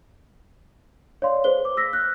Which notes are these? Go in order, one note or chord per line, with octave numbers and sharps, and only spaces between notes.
C#5 D5 F5 C6
G#4 B4 C5 G7
D6
E6 A#6 B6
F6 F#6